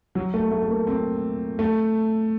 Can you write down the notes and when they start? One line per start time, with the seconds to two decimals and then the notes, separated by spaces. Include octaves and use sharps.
0.15 F#3
0.34 A3
0.52 A3
0.63 A3
0.70 A#3
0.87 C4
1.59 A3